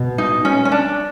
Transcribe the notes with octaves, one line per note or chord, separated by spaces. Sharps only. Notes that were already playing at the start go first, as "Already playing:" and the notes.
Already playing: B2
D#4
C#4
C#4
D4